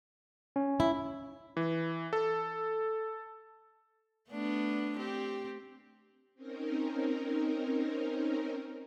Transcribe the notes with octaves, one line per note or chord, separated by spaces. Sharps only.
C#4
E4
E3
A4
A3 B3 D4
C4 G4
C4 C#4 D#4 A#4